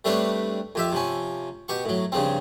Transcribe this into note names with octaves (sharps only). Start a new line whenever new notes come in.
G3 A3 C4 D4 B4 C#5
F2 G4 E5
C3 F3 C#4
B2 G4 C#6
A2 F#3
G2 C#3 F3 C4